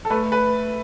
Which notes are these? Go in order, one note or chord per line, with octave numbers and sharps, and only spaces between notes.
A4
A3 B4
B4